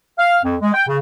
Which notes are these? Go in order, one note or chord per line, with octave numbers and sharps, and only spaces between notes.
F5
F2
G#3
G5
C#3